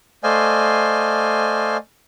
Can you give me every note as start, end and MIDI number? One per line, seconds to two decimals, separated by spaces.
0.24 1.77 57
0.24 1.77 72
0.24 1.77 74
0.24 1.77 75
0.24 1.77 77
0.24 1.77 80